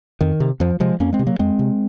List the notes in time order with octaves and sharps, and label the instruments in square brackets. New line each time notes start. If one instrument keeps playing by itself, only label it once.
[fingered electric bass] F2 D#3
C3
F2 F3
C3 F3 G#3
F2 A#3 C#4
G#3 C4
C3
F#3 A#3
F2 G#3 C4
C3